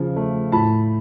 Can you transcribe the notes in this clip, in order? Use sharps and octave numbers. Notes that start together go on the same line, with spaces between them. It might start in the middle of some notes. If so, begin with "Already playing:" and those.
Already playing: C#3 F3
A3
A2 A5 B5